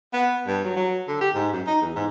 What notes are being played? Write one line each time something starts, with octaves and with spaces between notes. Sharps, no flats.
B3
G2
F#3
F#3
D3
G4
G#2
F#2
D#4
E2
G#2